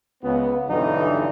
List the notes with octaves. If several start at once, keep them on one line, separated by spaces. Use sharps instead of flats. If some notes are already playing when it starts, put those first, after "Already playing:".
C#2 B3
B1 G2 D3 E3 D#4